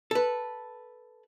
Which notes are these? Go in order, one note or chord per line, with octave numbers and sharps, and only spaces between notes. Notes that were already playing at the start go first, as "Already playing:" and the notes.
A4 B4